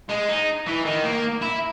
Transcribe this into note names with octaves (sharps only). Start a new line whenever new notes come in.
G#3
D#4
E3
D#3
A#3
E4